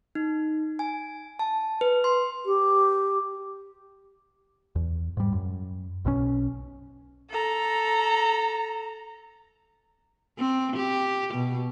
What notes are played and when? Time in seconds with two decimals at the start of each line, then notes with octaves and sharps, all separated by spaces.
0.15 D#4
0.79 G#5
1.39 A5
1.81 B4
2.04 C6
2.46 G4
4.75 E2
5.17 G#2 G3
5.32 F#2
6.05 B1 B2 D#3 C#4
7.30 A4 A#5
10.38 C4
10.76 G4
11.33 B2